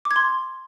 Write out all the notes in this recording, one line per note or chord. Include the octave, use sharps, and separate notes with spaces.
D6
G#6
C6